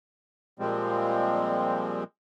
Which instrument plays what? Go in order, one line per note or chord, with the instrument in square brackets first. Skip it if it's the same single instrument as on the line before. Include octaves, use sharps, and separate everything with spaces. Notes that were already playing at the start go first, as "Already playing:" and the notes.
[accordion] A#2 F3 G3 G#3 C4